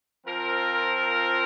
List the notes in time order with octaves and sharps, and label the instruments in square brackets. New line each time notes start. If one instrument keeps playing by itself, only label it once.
[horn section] F3 C4 F4 A#4